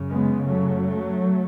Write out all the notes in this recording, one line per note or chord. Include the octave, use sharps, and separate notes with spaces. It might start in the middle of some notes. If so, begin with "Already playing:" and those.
Already playing: F#2 C#3
G#3 B3
F#3 A3